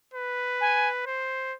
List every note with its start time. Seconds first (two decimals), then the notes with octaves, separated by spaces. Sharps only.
0.14 B4
0.61 G#5
1.06 C5